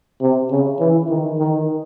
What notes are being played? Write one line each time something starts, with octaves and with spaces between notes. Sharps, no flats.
C3
C#3
E3
D#3
D#3